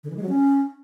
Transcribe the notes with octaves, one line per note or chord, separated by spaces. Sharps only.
D3
E3
G#3
F#3
C#4